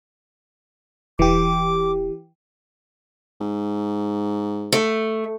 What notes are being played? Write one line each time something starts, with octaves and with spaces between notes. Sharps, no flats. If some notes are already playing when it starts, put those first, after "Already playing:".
E1 E3 G4 D6
G#2
A3